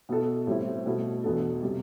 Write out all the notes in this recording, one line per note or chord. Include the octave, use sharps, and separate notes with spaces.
B2 B3 E4 A4
A2 G3 C4 E4
B2 A3 E4
E2 B2 B3 D4 A4
C3 G3